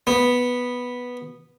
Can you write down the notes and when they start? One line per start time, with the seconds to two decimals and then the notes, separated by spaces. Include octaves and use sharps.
0.07 B3